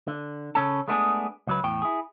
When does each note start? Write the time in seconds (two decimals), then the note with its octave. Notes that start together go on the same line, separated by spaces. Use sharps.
0.08 D3
0.55 C#3 C#4 A4
0.88 G#3 A3 B3 D4 G4 G#4
1.47 C#2 F#3 B4
1.64 E2 A2 G5
1.82 E4 G#4